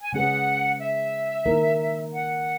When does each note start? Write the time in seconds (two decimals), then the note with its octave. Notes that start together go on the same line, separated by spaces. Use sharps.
0.02 G#5
0.13 C#3 G#3 C#4 G#4 B4 F#5
0.79 E5
1.46 D#3 A#3 E4 A#4
2.13 F#5